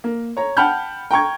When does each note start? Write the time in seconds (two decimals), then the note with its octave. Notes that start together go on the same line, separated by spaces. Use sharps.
0.04 A#3
0.37 C#5 A#5
0.57 F#5 G5 A5 B5 F6 G6
1.11 G5 A#5 C#6 G#6